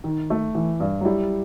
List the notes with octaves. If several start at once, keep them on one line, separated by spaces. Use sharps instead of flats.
D#3
A3
E3
G2
F#3
G3 E4